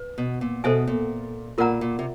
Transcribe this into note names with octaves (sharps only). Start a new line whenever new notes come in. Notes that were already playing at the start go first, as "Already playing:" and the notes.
Already playing: B4
B2
A#2
B2 A4 C5 E5 G#5
A#2
A#2 F4 A#4 D5 F#5 A#5
A#2
C3